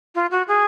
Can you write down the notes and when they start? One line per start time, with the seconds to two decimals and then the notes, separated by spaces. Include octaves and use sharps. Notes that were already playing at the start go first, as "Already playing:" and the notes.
0.15 F4
0.31 F#4
0.48 G#4